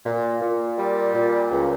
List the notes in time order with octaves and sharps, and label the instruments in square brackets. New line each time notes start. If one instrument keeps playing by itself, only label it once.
[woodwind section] A#2
A#2
G3
A#2
C#2